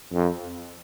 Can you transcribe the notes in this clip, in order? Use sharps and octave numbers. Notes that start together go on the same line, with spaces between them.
F2